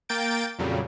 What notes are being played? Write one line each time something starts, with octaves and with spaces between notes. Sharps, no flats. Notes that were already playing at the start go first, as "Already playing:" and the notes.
A#3 A#4 G5 G6 A6 D7
F2 A#2 C#3 F#3 G3